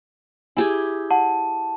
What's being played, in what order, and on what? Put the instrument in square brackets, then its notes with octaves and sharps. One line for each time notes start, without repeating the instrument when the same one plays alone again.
[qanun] E4 G4 G#4 [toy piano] G#5
[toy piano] F#5 [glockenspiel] A5